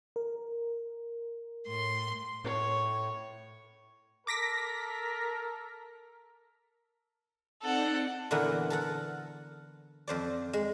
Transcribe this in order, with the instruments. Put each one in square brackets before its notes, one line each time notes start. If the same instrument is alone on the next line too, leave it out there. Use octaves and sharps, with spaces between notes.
[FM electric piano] A#4
[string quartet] A2 C6
[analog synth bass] A2 [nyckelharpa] C#5
[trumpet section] A4 A#4 [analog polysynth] D6 A#6 B6
[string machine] C4 D#4 D5 [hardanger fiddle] A4 F#5
[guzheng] A#2 D3 E3 B3 E4 A#4
A4 A#4 F#5
F2 C5 D5
G#3